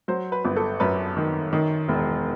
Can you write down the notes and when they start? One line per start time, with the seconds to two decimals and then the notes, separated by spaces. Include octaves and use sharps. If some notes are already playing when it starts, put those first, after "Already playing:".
0.08 F#3 C5
0.32 B4
0.45 G1
0.56 A4
0.80 F#2 B4
1.17 D#3
1.53 D#3
1.89 E1